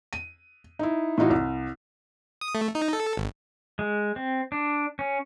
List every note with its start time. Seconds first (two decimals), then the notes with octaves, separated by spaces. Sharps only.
0.13 D#7
0.79 D#4 E4
1.18 A2 E3 D#4 F4 F#4
1.30 C2
2.41 D#6
2.55 A3
2.75 D#4
2.93 A4
3.17 G#1
3.79 G#3
4.16 C4
4.52 D4
4.99 C#4